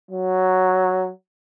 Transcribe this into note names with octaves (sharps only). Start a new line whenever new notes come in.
F#3